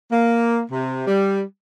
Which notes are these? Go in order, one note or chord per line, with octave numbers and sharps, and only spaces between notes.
A#3
C3
G3